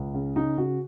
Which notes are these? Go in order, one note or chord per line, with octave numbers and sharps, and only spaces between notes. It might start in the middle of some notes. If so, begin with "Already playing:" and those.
Already playing: C#2
C#3
C#3 D#4
C#3 F#4